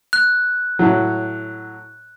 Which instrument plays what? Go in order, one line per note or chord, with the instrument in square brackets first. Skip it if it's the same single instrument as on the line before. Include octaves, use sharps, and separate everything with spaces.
[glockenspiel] F#6
[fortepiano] A2 F#3